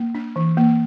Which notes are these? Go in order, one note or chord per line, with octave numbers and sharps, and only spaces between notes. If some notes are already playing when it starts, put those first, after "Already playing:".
Already playing: A#3
D4
E3
A#3